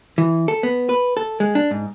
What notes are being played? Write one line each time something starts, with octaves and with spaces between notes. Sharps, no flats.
E3
A4
B3
B4
A4
G#3
D4
G#2